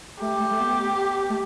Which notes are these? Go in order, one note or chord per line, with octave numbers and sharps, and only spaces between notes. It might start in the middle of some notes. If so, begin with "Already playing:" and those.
A3 G4
A3
A3
B3
A3